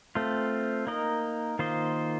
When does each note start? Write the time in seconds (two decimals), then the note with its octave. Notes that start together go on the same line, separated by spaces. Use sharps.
0.15 A3 C4 F4
0.87 A#3 D#4 A#4 D#5
1.59 D#3 A#3 F4 C5 D#5